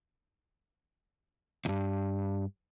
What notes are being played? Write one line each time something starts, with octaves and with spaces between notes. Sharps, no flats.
D2 G2